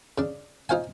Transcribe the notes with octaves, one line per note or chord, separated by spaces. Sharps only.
C#3 D4
D#4 F4 C5 F5 G#5